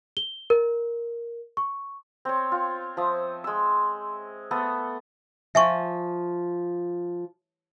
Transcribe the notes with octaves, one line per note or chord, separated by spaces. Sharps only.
G7
A#4
C#6
C4 C#5
F4
F3 E5 A5 D#6
G#3 E6
A3 B3 A4 D#6
F3 E5 G#5 C#6